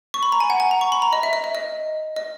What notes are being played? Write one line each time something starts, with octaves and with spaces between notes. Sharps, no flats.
C#6
B5
A#5
G#5
F#5
G#5
A#5
C#6
B5
A#5
D#5
E5
D#5
E5
D#5
D#5